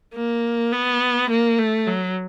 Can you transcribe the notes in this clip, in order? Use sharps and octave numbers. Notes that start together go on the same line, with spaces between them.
A#3
B3
A#3
A3
F#3